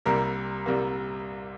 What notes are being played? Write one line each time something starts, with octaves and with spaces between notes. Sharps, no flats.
C2 C3 G3 A#3 A#4
C2 C3 G3 A#3